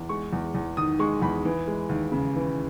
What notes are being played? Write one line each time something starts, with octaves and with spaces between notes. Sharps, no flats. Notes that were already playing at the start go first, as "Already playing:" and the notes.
Already playing: E2
G#3 C#6
E2
E2
D#3 D#6
G#3 C#6
E2 B5
E3
G#3
D#2
C#3
E3